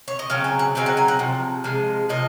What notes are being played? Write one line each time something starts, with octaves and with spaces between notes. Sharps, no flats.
C#5
D#5
C#3 F#3 C4 F5
G#5
F#5
C#3 F#3 C4 D#4 F5
F#5
G#5
F#5
C3 F3
C3 F3 G#3
C3 F3 D#5